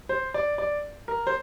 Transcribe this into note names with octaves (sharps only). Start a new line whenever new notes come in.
C5
D5
D5
A#4
C5